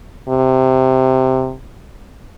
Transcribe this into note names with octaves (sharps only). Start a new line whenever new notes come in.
C3